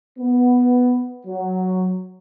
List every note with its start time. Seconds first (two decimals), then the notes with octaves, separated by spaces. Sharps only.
0.18 B3
1.27 F#3